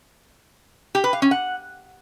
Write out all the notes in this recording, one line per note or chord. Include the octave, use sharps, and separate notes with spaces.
G4
B4
F5
C#4
F#5